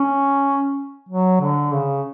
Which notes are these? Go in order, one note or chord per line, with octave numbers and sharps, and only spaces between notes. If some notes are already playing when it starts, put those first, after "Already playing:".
Already playing: C#4
F#3
D3
C#3